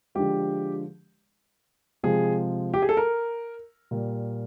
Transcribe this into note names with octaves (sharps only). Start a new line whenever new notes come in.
D3 F3 G#3 G4
C3 F3 G#3 G#4
G4
G#4
A4
A#4
A#2 G3